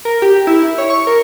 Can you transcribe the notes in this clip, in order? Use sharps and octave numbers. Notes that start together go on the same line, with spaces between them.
A#4
G4
E4
E4
C#5
C#6
A#4